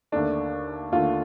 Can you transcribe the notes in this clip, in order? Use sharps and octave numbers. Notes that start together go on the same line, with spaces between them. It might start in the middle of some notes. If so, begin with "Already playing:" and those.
D#2 D3 A3 D4
D#2 D3 A3 F4